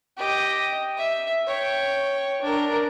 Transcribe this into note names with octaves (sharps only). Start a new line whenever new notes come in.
G4 D#5
E5
C#5 G5
D4 A#4